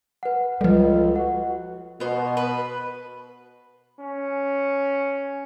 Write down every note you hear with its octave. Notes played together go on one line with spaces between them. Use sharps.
B4 F#5
C#2 F3 G3 A4 B4
F#4 F#5
B2 B3 C5
B4
C#4